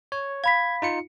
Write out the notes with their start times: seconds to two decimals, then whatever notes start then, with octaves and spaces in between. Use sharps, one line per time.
0.12 C#5
0.44 F5 B5 G#6 B6
0.82 D#4 F4 C#7